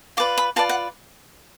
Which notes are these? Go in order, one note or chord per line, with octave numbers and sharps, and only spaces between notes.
F4 B4 D5 D6
B5
F4 B4 D5 A5
F#5